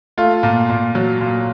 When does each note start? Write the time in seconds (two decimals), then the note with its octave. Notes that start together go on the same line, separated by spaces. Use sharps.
0.18 A3 F4
0.43 A#2
0.69 A#2
0.95 F#3
1.21 A#2